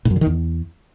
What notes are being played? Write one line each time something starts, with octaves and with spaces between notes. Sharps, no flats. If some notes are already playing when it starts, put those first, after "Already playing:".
A2
F#2
D3
D#3
E2